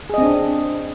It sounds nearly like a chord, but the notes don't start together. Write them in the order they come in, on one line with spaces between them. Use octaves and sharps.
G#4 D#5 C4 D4